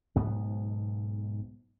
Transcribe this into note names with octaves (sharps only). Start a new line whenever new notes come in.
B1 G#2 B3